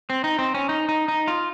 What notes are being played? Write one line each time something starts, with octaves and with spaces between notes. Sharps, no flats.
C4
D#4
C4
C#4
D#4
D#4
D#4
F4